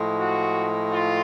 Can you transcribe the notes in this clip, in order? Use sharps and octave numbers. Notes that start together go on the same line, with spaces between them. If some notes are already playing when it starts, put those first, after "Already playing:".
Already playing: A2 F3 G#3
F#4
F4